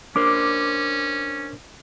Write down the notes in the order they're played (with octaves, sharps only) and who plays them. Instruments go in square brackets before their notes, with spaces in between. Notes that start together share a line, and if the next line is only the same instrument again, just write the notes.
[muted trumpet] C#4 [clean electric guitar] D4 A#4 C5 [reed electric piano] D6